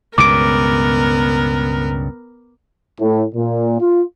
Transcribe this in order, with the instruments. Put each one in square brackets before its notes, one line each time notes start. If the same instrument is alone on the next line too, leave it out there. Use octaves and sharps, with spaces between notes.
[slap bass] C#2 G2 B2 [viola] B3 A#4 [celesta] D6 D7
[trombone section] A2
A#2
F4